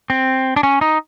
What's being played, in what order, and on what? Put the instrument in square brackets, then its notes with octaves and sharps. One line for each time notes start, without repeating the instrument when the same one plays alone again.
[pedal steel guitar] C4
D4
C#4
D#4